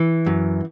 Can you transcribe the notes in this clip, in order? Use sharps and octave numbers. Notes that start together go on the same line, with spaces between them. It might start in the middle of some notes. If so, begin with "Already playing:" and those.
Already playing: E3
F#2